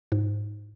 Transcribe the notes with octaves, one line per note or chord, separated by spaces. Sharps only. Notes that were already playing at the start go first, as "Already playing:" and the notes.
G#2